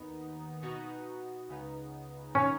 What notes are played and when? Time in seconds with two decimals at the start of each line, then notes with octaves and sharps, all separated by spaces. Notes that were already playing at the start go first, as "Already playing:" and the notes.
Already playing: D#2 D#3 B3 D#4
0.62 B2 B3 D#4 F#4
1.48 C#2 C#3 B3 D#4
2.35 D#3 F#3 C#4 D#4